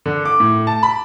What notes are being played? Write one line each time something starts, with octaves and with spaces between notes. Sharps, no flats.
D3
D6
A2
A5
B5